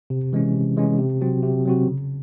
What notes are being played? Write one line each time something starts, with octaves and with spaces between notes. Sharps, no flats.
C3
E3 G#3 C#4
C3
E3 G#3 C#4
C3
F#3 C4 F#4
C3
F#3 C4 F#4
C#3